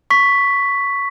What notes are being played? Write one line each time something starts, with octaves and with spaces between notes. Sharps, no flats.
C#6 B6